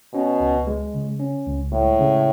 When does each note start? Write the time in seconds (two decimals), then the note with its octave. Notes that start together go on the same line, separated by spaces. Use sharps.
0.13 B2 C#4
0.40 C#2
0.67 G#3
0.94 C#3
1.20 C#4
1.47 C#2
1.72 A2 G#3
2.00 C#3